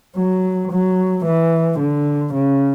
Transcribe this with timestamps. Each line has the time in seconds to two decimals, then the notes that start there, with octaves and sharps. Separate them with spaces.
0.17 F#3
0.71 F#3
1.25 E3
1.79 D3
2.34 C#3